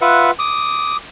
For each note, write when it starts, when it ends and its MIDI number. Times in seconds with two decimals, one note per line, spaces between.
0.01 0.31 65
0.01 0.31 71
0.01 0.31 76
0.01 0.31 78
0.39 0.97 86
0.39 0.97 87